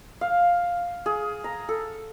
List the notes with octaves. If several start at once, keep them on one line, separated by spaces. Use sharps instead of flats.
F5
G#4
A#5
A4